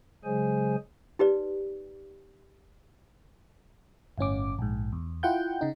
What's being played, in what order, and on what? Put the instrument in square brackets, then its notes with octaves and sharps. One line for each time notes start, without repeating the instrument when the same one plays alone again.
[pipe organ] C#3 F#3 G#3 G#4 C5 G#5
[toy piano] D#4 G4 B4 D5
[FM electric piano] G1 A2 C#4 D6
A#1 G#2
E2
E4 F4 F#5 G5 G6
C#3 D#4